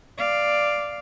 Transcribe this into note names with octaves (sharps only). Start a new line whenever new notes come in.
D5 F5